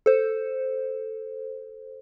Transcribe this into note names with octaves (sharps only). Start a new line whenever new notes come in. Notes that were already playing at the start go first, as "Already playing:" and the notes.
A4 C5